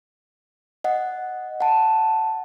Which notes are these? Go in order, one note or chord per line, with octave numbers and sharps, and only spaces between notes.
D#5 F#5
F#5 A5